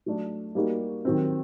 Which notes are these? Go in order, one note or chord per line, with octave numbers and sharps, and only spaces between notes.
F#3 A3 D4
G3 A#3 D#4 F#4
D#3 F#3 C4